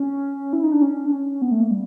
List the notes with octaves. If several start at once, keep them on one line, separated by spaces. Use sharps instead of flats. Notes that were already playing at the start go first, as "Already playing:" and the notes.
Already playing: C#4
E4
D#4
D4
C#4
D4
C#4
B3
A3
A#3
G3